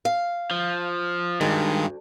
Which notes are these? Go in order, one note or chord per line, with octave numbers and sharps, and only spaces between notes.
F5
F3
D2 G2 D#3 G#3